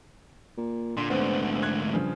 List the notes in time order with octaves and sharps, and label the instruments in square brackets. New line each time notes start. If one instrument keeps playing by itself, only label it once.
[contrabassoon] A#2
[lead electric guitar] A#2 [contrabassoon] D3 [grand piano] C6
[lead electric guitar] D2 G#2 [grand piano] B3 C4
[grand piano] F#6 G#6
[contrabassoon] G2 [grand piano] C#3 F3